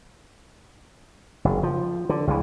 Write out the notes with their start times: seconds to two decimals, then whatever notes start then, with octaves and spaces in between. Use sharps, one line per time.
1.45 F#1
1.63 F3
2.09 D3
2.27 C#2 E3